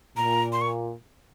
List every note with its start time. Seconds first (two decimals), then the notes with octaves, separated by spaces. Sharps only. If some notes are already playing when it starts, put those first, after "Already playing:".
0.16 A#2 A#5
0.52 C6
0.61 C#6